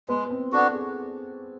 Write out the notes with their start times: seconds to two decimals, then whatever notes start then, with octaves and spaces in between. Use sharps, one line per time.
0.08 G#3 B3 B4
0.26 B4
0.30 C4 C5
0.52 B3 D4 F#4 A4
0.74 G#4